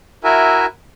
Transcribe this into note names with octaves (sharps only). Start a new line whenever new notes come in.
E4 F#4 A#4 E5 G#5